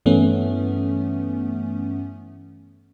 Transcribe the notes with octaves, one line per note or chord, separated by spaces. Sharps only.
G2 E3 A3 B3 C#4